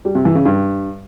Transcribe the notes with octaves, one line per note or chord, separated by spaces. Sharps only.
G3
C3
E3
C#3
G2